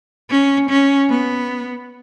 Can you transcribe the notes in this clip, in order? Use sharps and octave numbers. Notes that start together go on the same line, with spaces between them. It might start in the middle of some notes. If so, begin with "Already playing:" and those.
C#4
C#4
B3